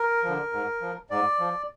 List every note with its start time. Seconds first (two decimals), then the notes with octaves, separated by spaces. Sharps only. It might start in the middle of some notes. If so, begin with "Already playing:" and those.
Already playing: A#4
0.24 D3 F3
0.53 G#2
0.81 F3
1.10 G#2 D5
1.39 F3